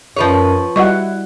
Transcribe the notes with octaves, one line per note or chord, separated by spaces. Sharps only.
F#2 F3 B4 C#5
G3 E4 F#4 D#5 F#5 C#6